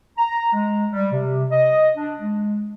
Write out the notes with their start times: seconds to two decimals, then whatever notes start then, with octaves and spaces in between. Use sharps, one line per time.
0.17 A#5
0.53 G#3
0.93 G3
1.11 C3
1.50 D#5
1.96 D4
2.19 G#3